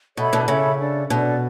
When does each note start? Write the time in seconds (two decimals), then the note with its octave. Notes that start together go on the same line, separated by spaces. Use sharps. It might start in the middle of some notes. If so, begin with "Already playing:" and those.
0.17 B2 A4 C#5 E5 B5
0.33 B2 D3
0.48 C#3 A4 C#5 E5 B5
0.79 D4 A4 D5
1.10 B2 D4 A4 D5